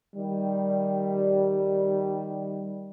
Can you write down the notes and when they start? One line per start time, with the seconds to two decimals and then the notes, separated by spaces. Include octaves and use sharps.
0.16 D#3 G3